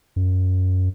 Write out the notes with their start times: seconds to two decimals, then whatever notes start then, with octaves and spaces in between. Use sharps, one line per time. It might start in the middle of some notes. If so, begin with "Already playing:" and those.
0.16 F#2